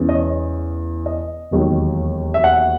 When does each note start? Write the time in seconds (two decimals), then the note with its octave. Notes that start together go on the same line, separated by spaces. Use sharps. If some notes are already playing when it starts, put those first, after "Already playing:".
Already playing: E1 E2 C#3 E3
0.09 D#5
0.14 C#5
1.06 D#5
1.51 E1 D#2 D#3 F#3
2.34 E5
2.44 F#5